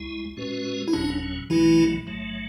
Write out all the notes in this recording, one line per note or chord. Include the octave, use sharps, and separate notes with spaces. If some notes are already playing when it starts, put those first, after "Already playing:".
Already playing: C#2 G#3 E4
A2 G#3 C#4 F#4 B4
E4
F#1 E2 B2 F#3 C#4 D4
B1 B2 E3 F#3 A3 E4
A1 G#2 F#3 A3